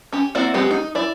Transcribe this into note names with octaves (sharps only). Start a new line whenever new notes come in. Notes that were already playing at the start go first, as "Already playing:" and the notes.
C#4 G4
A#3 C4 E4 F#4 D5
F#3 G#3 B3 C4 G4
D#4
E4 D5